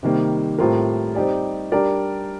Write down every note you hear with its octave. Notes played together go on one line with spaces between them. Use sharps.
C3 D#3 G3 A#3
A2 G3 C4 F4 A#4
G3 C4 D#4 G4 D5
G3 D4 G4 A#4 D5